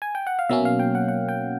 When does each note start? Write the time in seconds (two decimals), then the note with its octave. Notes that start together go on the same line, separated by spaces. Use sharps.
0.02 G#5
0.15 G5
0.27 F#5
0.39 F5
0.49 B2 F#3 A#3 C#4 E5
0.65 F5
0.79 G5
0.95 F#5
1.08 F#5
1.29 G5